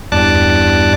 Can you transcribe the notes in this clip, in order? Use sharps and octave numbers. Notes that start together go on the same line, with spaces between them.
E2 G2 D5 A5 F#6